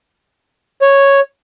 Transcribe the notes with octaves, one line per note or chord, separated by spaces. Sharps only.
C#5